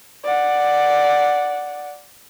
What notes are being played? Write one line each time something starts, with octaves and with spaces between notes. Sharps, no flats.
D5 F#5